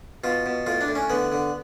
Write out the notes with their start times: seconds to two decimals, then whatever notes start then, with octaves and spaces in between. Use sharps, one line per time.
0.24 B2 F4
0.46 B2
0.66 A2 F4
0.81 D4
0.88 A2
0.95 C#4
1.10 D3 B3
1.32 D3